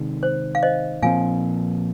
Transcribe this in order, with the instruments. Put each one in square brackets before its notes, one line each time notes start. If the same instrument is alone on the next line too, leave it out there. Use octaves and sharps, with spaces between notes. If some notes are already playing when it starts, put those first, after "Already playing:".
Already playing: [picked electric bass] C3 D#3 G#3
[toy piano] C5
F5
C5 D#5
[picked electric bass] A#2 F3 C4 [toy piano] F5 G#5